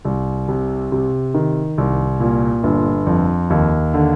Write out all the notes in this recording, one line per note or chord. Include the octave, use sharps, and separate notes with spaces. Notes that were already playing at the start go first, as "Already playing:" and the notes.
C2
C3
C3
D#3
C2
A#2
G1
F2
D#2
D3